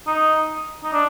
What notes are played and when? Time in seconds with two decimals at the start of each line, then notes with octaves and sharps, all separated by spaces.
0.07 D#4
0.84 D#4
0.92 D4